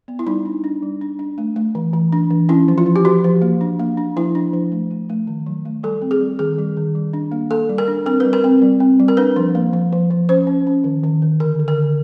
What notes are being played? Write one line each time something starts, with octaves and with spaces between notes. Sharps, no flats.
B3
E4
G3 D#4
D4
D4
G3
D4
D4
A3
A3
E3
E3
D4
E3
C#4 E4
F3
F4
F3
G4
F3 F#4
F3
A#3
D4
A#3
D4
F3 E4
D4
F3
A3
A3
A3
D#3
F#3
A3
G3 A4
C4
G#4
G3
D#3 G#4
G3
D#3
G3
D4
A#3
A#3 A4
G3
A#4
D4
C4 A#4
G3 B4
A#4
C4
G3
C4
G3
A#4
D4 B4
F3
A#3
F3
F3
F3
C#4 C5
C#4
C#4
D#3
D#3
D#3
D3 A#4
D3
A#4
D3